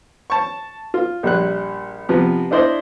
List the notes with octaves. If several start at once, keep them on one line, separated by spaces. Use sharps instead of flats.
A5 C#6
F4
A#1 G3 F#6
C3 F3 B3
D4 E4 C5 D5 D#5